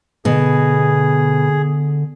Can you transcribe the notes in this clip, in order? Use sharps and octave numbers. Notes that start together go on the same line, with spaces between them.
B2 D3 G#4